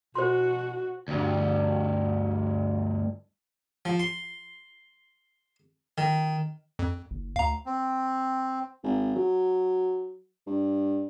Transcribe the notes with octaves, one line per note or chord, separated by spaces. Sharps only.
B2 F#4 C5 C6
D2 G2
F3
C6
D#3
F2
F#1
D2 F5 A#5
C4
G#1
F#3
G2